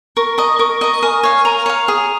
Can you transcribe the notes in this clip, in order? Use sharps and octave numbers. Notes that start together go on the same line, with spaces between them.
A#4 C#6
D#5 A#5
A#4 C#6
D#5 A#5
A#4 G#5
C#5 F5
A#4 A#5
C#5 F5
G#4